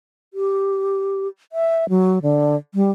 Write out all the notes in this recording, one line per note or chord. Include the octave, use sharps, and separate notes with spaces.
G4
E5
F#3
D3
G3